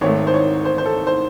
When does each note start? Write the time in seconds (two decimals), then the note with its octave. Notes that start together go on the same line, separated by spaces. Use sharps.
0.01 G#1 G#2 D#3 A3 C#5
0.27 C5
0.34 C#5
0.65 C5
0.78 C5
0.85 A4
1.07 C5